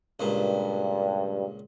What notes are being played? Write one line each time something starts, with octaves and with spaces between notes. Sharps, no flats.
C#2 G2 A#2